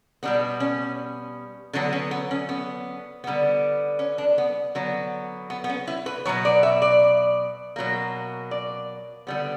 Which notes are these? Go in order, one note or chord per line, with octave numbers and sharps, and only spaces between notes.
B2 G3 B3 D4
C#4
D3 F#3 B3 D4
C#4
B3
C#4
B3
D3 G3 B3
C#4
D4
B3
D3 F#3 B3
B3
B3
C#4
E4
B4
B2 F#3 B3 C#5
D5
E5
D5
B2 F#3 A#3
D5
D3 G3 B3